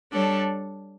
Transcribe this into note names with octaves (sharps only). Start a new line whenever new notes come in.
G3 D4 A4 C#5